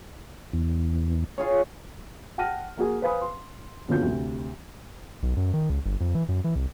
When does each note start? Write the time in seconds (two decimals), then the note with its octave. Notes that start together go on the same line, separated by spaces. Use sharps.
0.53 E2
1.38 F4 G#4 C#5
2.38 F#5 G5 A5 F6 A#6 D#7
2.77 A#3 F#4 G#4
3.02 B4 C5 F5 G#5 B5 D#6
3.21 C6
3.88 D#2 B2 D3 C#4 F4 G6
4.02 D2 C3
5.23 B1
5.37 F#2
5.54 D#3
5.70 C#2
5.86 G1
6.01 F2
6.15 E3
6.29 F#2
6.44 E3
6.56 C2